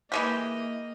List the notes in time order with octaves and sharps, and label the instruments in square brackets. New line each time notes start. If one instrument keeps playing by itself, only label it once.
[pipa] E3 G#3 G4 [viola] A#3 D#5